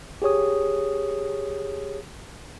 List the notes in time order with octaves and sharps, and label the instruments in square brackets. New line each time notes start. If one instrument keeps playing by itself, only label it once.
[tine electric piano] G4 G#4 C#5 D#6